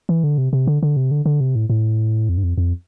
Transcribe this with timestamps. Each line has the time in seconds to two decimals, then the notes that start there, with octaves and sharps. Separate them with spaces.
0.09 E3
0.24 D3
0.38 C3
0.53 C3
0.67 D3
0.83 D3
0.97 C3
1.11 D3
1.26 D3
1.40 C3
1.56 A2
1.70 A2
2.29 F2
2.37 G2
2.44 F2
2.58 F2